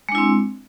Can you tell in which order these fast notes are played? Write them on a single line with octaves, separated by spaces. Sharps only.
G#3 D4 E4 C4